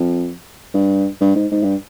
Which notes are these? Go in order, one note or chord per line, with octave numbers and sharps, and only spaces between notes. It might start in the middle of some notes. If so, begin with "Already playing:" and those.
Already playing: F2
G2
G2
G#2
G#2
G2